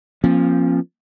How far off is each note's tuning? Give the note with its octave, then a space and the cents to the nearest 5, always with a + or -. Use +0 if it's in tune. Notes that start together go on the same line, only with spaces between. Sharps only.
F3 +0 A#3 +25 C#4 -40